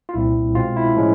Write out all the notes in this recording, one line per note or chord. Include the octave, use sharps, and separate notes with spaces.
F4
C2 A#2 G3 C4 E4
B2 G#3 C4 F4
E4
A2 F3 G#3 C#4